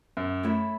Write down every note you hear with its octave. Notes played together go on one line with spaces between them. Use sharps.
F#2
A3 E4 C#5 E5